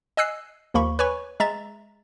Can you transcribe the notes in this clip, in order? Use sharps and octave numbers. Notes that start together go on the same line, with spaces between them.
D#5 G#5 E6 F#6 C7
D#2 F3 A#3 B5 C#6
B4 C#5 G#5 C#6
G#3 E5 A#5 A6 E7